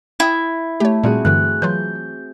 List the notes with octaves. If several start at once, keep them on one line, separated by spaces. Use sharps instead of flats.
E4 G5 D#6
A3 G4 C#5
A#2 G3 C4 F#4 G#4
G2 D3 E3 F#6
E3 F#3 F4 G6